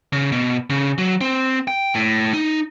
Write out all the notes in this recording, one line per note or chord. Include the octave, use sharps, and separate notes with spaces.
C#3
B2
C#3
F#3
C4
G5
A2
D#4